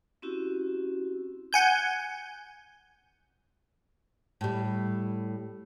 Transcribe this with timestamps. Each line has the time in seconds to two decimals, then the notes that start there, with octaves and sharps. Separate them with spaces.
0.22 C4 C#4 E4 F#4 G4
1.53 F#5 G#5 G6
4.41 A2 G3